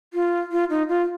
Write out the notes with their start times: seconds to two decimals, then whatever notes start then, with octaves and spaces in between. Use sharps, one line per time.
0.14 F4
0.51 F4
0.70 D#4
0.89 F4